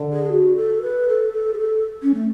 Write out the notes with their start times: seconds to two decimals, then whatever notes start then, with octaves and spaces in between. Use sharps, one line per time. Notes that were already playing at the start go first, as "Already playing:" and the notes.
Already playing: D3
0.13 G#4
0.32 F#4
0.56 A4
0.82 B4
1.08 A4
1.33 A4
1.54 G#4
1.58 A4
2.03 C#4
2.14 A3